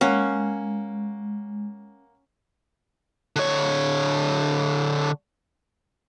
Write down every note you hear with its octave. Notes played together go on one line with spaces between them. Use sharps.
G#3 A#3 C#4 F#5
D3 C#5